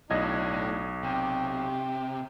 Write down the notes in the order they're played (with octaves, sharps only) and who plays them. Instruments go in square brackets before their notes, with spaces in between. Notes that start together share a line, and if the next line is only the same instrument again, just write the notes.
[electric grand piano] B1 D#5 G#6 [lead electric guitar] A3 E4 [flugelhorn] D4
[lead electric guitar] C3 [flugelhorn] G5
[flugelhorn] G4